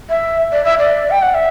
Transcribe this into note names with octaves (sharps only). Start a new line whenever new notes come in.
E5
D5
E5
D5
G5
F#5
E5